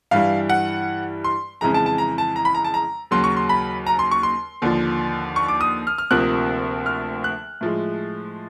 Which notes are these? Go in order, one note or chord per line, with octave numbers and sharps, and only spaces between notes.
G2 E3 G3 F5
F#5
C6
F2 C#3 E3 G#3 A#5
A5
A5
A#5
A5
A#5
B5
A#5
A5
A#5
D#2 C#3 F#3 C6
C#6
C6
B5
A#5
C6
C#6
C6
D#2 D3 F3
C#6
D6
D#6
F6
F6
D2 C3 F3 A#3 F#6
F6
F#6
A2 F3 G#3